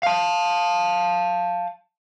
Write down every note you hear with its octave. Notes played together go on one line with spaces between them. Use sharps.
F5 A5